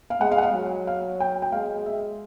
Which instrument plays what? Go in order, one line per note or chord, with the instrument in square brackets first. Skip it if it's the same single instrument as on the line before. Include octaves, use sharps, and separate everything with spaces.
[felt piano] F5
[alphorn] G#3 [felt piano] F#5
[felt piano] F5
F#5
F5
[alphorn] F#3
[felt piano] F5
G5
G5
[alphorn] G#3 [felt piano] F5
[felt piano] E5